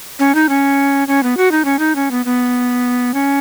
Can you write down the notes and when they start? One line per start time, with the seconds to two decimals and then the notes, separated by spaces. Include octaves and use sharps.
0.19 C#4
0.35 D#4
0.49 C#4
1.08 C#4
1.23 B3
1.37 F#4
1.52 D#4
1.65 C#4
1.79 D#4
1.96 C#4
2.11 B3
2.25 B3
3.14 C#4